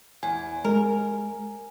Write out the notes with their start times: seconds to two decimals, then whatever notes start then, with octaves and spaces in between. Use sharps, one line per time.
0.23 E2 G#5
0.65 G#3 A#4